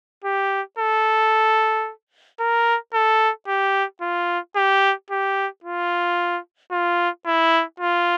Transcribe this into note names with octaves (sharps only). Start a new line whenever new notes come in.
G4
A4
A#4
A4
G4
F4
G4
G4
F4
F4
E4
F4